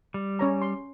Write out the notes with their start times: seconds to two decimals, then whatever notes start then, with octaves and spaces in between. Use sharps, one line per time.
0.14 G3
0.39 C#4 C#5 A#5
0.62 C6